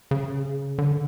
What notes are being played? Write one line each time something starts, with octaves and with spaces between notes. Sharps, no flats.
C#3
D3